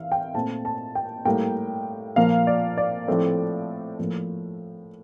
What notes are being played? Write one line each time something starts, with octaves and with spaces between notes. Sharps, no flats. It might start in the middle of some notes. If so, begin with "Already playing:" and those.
Already playing: E3 E5 F5
G5
A#2 A3 C4 A5
A5
G5
A2 G3 A#3 G5
A#2 F3 A#3 F5
D5
D5
A2 F3 A3 C4
A2 F3 A#3